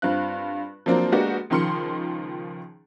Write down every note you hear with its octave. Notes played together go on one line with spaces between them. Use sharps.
G2 C4 F4 F#6
F3 F#3 A#3 C4 D4
G#3 A#3 B3 D4 F#4 G4
C#2 D#3 F3 C6 F6 C#7